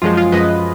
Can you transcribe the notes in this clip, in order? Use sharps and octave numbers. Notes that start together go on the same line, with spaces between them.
F#2 F3 G#3 F4
F4
F#2 F3 G#3 B4 D#5